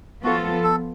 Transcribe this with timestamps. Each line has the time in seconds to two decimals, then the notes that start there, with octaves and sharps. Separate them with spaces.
0.24 F3 B3 F4 F#4 A4
0.64 A4